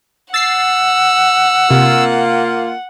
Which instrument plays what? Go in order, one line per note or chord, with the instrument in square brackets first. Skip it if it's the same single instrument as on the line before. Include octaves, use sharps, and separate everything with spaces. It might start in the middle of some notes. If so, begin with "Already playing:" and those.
[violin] F#5 [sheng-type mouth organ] E6 [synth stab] A6 C7
[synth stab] C3 [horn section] A#3 F4